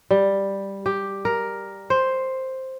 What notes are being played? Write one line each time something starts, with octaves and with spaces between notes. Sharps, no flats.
G3
G4
A#4
C5